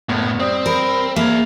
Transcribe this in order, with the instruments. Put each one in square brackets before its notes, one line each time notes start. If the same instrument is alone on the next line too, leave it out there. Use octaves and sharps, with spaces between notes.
[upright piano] F#1 D2 B3 [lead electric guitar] A2
[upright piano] G3 [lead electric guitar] C4 [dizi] D#6
[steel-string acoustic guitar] A#4 [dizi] B5
[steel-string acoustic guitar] A#3 [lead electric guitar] G#4 E5 [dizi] F5